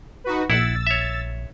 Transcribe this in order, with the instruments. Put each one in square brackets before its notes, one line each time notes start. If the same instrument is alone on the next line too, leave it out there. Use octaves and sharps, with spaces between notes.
[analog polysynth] D#4 F#4 B4
[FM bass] A#1 [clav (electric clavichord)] E4 F#5 [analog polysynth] E6 A6
[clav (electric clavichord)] C#5 E5